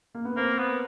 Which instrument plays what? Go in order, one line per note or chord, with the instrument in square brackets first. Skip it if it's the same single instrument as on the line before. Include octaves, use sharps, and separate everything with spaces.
[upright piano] A#3
B3
[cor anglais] A#3 [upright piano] C4
[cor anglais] B3